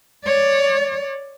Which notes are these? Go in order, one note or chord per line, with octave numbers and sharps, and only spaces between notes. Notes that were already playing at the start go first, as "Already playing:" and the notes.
C#5 D5